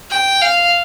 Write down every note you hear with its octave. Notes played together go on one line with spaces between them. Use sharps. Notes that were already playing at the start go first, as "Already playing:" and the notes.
G5
F5